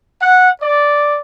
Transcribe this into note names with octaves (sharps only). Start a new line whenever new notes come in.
F#5
D5